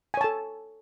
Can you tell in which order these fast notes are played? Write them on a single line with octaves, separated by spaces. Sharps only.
G#5 C#5 A5 A4